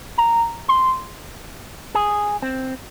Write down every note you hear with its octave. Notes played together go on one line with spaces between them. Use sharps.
A#5
C6
G#4
C4